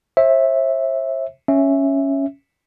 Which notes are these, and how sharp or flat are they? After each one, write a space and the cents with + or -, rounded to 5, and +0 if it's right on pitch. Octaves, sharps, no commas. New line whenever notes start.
C5 +40 E5 -5
C#4 +0 E5 +0